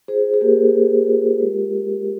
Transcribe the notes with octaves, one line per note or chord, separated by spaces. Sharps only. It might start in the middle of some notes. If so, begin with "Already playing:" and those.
F4 G#4 C5
G#4
A#3 G4 A#4
A#3
F4
G#3
F4